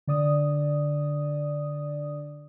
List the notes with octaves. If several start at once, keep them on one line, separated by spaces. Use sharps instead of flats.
D3 D5 D#6